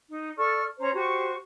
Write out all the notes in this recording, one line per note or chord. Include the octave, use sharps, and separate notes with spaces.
D#4
A4 D5 C#6 F6
C#4 C5 A#5
F#4 G4 C5 C#6